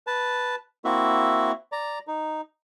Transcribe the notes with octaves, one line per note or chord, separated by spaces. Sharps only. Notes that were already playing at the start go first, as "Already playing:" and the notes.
B4 A5
A#3 C4 E4 F#4 E5
D5 A#5
D#4